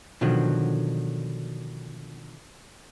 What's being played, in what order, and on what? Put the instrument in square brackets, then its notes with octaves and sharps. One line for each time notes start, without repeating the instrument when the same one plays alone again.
[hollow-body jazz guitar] B2 D3 D#3 F3 F#3